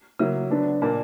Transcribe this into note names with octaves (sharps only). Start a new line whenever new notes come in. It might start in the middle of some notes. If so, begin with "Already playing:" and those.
C#3 F#3 A#3 E4
D3 F#3 B3 D4
A#2 A#3 D4